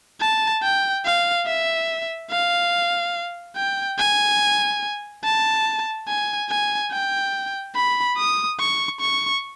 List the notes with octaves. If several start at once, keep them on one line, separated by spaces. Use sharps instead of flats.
A5
G5
F5
E5
F5
G5
G#5
A5
G#5
G#5
G5
B5
D#6
C#6
C#6